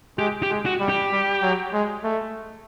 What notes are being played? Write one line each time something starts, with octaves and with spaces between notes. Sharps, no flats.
G#3 G4
G4
G#3
F#4
G3
G4
G3
F#3
G#3
A3